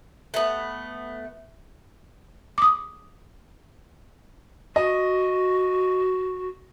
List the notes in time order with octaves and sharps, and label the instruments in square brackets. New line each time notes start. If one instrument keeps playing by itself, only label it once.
[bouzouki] A3 B3
[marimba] D6 D#6
[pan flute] F#4 [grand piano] D#5